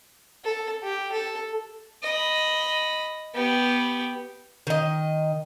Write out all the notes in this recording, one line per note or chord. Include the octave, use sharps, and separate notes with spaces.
A4
G4
A4
D#5 B5
B3 G4
D#3 D#5